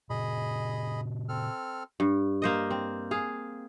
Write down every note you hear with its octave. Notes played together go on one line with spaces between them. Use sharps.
A#2 C#3 G#4 D#5 B5
C4 A4 F6
G2
A#3 C5 D#5
C4
G#4 F5